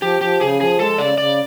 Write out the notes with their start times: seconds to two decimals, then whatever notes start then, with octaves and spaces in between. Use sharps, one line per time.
0.02 F3 G4
0.21 F3 G4
0.41 C#3 G#4
0.60 F3 G#4
0.79 G#3 A4
0.98 C#3 D5
1.18 C#3 D5